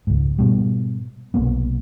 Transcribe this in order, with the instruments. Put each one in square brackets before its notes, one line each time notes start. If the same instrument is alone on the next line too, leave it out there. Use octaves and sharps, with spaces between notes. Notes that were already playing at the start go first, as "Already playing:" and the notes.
[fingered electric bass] C#2 G#2
G#2 B2 G3
B1 C3 A#3 B3